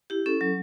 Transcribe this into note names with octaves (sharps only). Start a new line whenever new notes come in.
E4 G4
C#4 A4
F#3